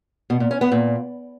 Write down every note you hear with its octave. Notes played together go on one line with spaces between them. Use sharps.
B2
A#2
C#4
B3
A#2